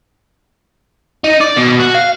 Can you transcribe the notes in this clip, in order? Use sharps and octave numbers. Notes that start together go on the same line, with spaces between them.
D#4
D5
B2
F#4
F5